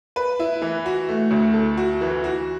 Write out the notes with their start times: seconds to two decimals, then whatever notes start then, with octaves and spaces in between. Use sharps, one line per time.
0.16 B4
0.39 E4
0.62 E3
0.86 F#4
1.09 A3
1.31 D2
1.54 A4
1.77 F#4
2.01 E3
2.24 F#4